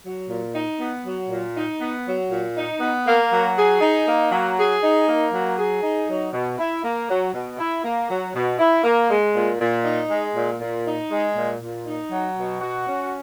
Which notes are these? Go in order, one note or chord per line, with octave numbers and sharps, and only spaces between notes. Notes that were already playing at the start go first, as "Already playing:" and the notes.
F#3
A#2
D#4
B3
F#3
A#2
D#4
B3
F#3
A#2
D#4
B3
A#3
F#3
G#4
D#4
A#3
F#3
G#4
D#4
A#3
F#3
G#4
D#4
F#3
B2
E4
A#3
F#3
B2
E4
A#3
F#3
B2
E4
A#3
G#3
A#2
A#2
D#4
G#3
A#2
A#2
D#4
G#3
A#2
A#2
D#4
F#3
B2
F#4
C#4